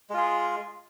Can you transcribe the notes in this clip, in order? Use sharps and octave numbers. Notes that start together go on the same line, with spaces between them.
G#3 F4 G#4